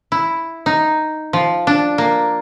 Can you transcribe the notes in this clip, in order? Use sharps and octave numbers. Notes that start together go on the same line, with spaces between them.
E4
D#4
F3
D4
A#3